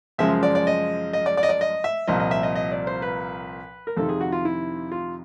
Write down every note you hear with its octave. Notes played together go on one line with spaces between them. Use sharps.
F#2 C#3 F3 G#3 E5
D5
D5
D#5
D#5
D5
D5
D#5
D5
D#5
E5
C2 A#2 F3 D#5
D#5
E5
D#5
D#5
D5
C5
B4
A#4
F2 C3 D#3 A4
G#4
F#4
F4
E4
F4